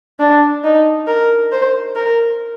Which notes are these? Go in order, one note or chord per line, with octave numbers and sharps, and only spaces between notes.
D4
D#4
A#4
C5
A#4